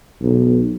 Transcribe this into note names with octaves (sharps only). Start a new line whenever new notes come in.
B1